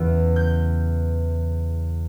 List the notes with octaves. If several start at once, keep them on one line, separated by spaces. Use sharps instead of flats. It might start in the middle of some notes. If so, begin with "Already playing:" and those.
Already playing: E2 C#3 E3
G6